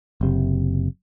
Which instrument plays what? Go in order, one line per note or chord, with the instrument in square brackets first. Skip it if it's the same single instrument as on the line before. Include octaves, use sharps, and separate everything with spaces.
[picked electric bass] F#1 C3